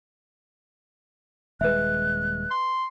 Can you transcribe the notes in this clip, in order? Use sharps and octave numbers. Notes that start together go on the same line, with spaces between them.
D#1 G#3 B4 E5 F#6
C6